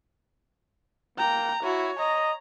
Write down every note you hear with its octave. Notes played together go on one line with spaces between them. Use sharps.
A#3 G5 A#5
E4 F#4 C#5
D#5 A#5